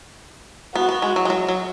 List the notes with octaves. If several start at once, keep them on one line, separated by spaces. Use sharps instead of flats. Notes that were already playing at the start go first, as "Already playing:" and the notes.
B3 F#4
B3
G#3
F#3
G#3
F#3
F#3